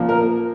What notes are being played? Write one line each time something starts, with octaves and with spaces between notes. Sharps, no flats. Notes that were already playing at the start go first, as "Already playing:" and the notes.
Already playing: A#2 F3 A#3
A#4